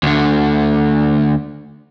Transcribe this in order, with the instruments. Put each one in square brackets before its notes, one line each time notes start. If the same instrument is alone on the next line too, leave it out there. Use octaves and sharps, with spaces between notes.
[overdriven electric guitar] D2 D3